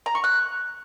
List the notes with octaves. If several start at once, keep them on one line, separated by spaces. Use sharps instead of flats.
A#5
C#6
F#6